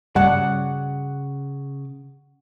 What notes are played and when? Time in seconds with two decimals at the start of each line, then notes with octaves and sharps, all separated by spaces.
0.16 G2 C#3 G3 D5 F#5 A5